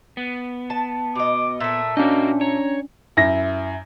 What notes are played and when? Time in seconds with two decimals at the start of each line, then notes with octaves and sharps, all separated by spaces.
0.17 B3
0.70 A5
1.15 B2 D#5 D6
1.60 A#2 A3 E5
1.97 A#3 C#4 D4 F#4 D#5
2.41 C#5 A#5
3.17 F#2 E4 A#6